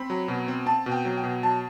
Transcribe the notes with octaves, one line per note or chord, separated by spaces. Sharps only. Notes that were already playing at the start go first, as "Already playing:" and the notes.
Already playing: C4 B5
F#3
B2
C4
C4 A5
B2
G5
F#3
G5
B2
F#3 A5